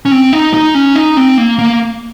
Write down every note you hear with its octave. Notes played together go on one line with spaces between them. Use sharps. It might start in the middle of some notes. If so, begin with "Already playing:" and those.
C#4
C4
D#4
D#4
C#4
D#4
C4
A#3
A#3